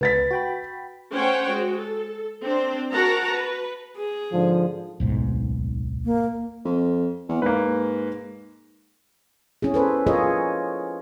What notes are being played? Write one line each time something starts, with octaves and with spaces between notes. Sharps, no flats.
C#2 B4 A6 B6
F#4 G5 B5
A3 C#4 C5 C#5 F#5 G5
G#3 F#4
A4
C4 D4 C5
F#4 A#4 F#5 A5 A#5
B4
G#4
G#2 D3 F3
D1 B1 G#2
A#3
F2
E2
G#2 A#3 B4
C#4 E4 G#4
A4 B4 C5
F4 G#4 A#4 C#5 D#5